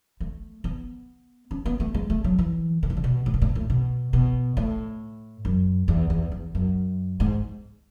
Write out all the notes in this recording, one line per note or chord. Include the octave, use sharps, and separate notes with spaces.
A3
B3
C#4
B3
A3
G#3
A3
F#3
E3
D3
E3
D3
B2
A2
B2
A2
B2
A2
B2
B2
A2
F#2
E2
E2
E2
F#2
G#2